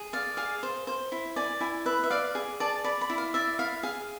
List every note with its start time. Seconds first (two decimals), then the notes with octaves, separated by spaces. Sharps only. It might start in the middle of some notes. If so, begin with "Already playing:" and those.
Already playing: G#4
0.13 D5 F5
0.37 G#4 F5
0.63 C5
0.87 C5
1.12 E4
1.36 D5 G#5
1.61 E4 G#5
1.86 B4 E5
2.04 E5
2.10 D5 F5
2.35 G#4
2.60 D5 A5
2.84 D5 B5
3.01 B5
3.10 E4
3.18 F5
3.34 D5 E5
3.59 E4 F5
3.83 G#4 F5